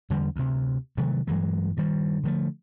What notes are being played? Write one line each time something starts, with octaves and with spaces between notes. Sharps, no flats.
E2 D3 G3
D2 C3
C3 D#3 F#3 A3
G2 E3 F#3 G#3
G2 D#3 G3
D3 F3 A3